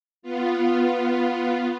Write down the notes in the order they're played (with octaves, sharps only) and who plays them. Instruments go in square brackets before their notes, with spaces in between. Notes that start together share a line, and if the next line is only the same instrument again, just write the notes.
[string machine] B3 F4